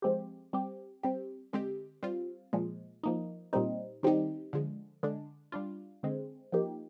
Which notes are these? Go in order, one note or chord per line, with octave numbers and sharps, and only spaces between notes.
F3 G#3 C4 G4
G3 C4 G4
G3 C4 G4
D3 G#3 C4 G4
G3 C4 F4
A#2 F3 G#3
F3 A#3 D#4
A#2 G3 C4 D#4
D#3 G3 C4 D#4 G4
D3 F3 G#3
D3 G#3 D4
G3 D4 F4
D3 G#3 C4
F3 A#3 D#4 G4